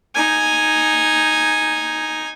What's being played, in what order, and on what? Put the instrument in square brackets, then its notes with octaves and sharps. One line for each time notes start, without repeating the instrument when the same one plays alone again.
[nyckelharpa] D#4 G#5